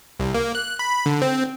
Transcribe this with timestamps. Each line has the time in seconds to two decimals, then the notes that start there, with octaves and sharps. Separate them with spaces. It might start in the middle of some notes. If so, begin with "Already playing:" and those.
0.20 C2
0.34 A#3
0.55 F#6
0.79 B5
1.06 D3
1.22 C4